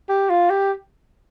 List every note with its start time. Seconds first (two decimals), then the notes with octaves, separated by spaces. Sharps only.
0.09 G4
0.29 F4
0.50 G4